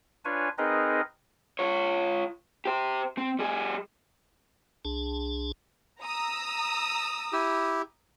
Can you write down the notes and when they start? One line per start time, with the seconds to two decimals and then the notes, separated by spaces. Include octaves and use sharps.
0.25 D4 F4 B4 C#5 G#5
0.58 C4 D#4 G#4 A#4 B4 D#5
1.59 F4 C#5
2.65 G4 C5
3.18 C4
3.39 G3 G#4
4.85 C2 D4 G#4 A5
6.01 A#5 D#6 E6
7.33 E4 G4